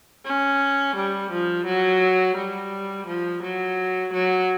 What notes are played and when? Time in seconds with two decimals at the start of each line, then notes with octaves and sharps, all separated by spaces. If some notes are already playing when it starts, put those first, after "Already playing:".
0.25 C#4
0.96 G3
1.31 F3
1.66 F#3
2.37 G3
3.07 F3
3.42 F#3
4.13 F#3